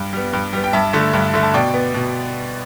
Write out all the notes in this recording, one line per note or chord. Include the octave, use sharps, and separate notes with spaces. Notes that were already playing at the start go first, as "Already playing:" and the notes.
Already playing: G2
G3 B3
G2
G3 B3
G5
G2 E5 A5
D3 A3
G2
D3 A3
A5
B2 D5 G5
B3
B2